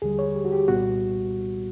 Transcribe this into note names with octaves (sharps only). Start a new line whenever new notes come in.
D#2 D3 G3 G#4
C#5
G4
F#4
G4
C2 A#2 G3 B3 F#4